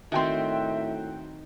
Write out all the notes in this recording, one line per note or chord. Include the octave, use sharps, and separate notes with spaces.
A2 D#3 C4 F#4 E5 G5 C6